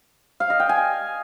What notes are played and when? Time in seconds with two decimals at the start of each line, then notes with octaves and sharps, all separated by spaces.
0.40 F5
0.50 D#5
0.60 G5
0.69 G#5